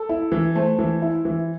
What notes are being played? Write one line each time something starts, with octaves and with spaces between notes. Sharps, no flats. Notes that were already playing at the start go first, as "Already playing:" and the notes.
Already playing: A4
E4
E3
A3 C5
E3
E4
E3